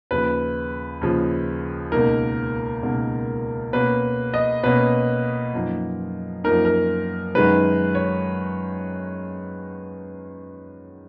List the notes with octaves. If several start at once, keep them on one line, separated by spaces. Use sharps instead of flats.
D#2 C#3 F3 B4
D#2 C#3 F3
C#2 B2 A#3 D#4 A#4
C#2 B2 A#3 D#4
B2 A#3 C#4 B4
D#5
B2 A#3 C#4 B4
F#2 F3 A#3 D#4
F#2 F3 A#3 D#4 A#4
A#4
F#2 D#3 G#3 D#4 B4
C#5